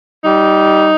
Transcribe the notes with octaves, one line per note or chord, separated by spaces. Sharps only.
G3 D#4